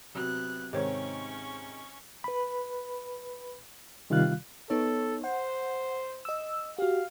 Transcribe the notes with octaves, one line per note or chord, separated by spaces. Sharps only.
C3 F#3 B3 F#6
G#2 C3 D#3 C#4 G4 C5 C#5 C#6
B4 B5
C3 D#3 G3 F4 F5 F#6
B3 D#4 A4 C#5
C5 F#5
D#5 E6
F#4 G4 F5